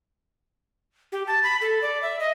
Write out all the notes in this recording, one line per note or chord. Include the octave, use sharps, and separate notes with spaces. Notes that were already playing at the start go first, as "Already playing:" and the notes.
G4
A5
B5
A4
D5
E5
D#5